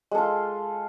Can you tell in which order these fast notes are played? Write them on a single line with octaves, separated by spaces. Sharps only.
G#3 A4 F4